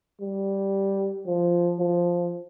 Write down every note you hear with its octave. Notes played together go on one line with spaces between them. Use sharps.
G3
F3
F3